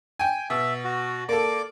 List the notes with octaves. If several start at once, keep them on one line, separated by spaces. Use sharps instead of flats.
G5 G#5
B2 E5
F#4
A#3 A4 D5 D6